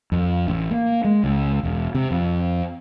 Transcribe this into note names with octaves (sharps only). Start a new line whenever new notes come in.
F2
A1
A#3
G#3
C#2
E1
C3
F2